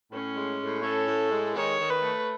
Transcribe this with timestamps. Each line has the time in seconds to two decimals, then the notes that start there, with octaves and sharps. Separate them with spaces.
0.11 A2 C#4
0.36 G#3
0.60 A2
0.83 C#4 A4
1.07 A2
1.31 G#3
1.54 D#3 C#5
1.79 D#3
1.90 B4
2.01 A3